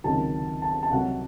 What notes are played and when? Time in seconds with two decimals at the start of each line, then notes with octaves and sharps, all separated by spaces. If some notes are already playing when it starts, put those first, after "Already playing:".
0.04 C#2 C3 D#3 F#3 A5
0.62 A5
0.83 A5
0.91 C2 C3 F#3 F#5